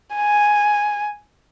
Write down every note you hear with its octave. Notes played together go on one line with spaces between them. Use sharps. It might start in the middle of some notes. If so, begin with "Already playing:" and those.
G#5